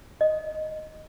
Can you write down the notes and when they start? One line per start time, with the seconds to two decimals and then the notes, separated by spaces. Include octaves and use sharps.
0.21 D#5